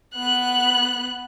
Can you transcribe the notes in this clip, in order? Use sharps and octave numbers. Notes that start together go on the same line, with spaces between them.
B3 F#6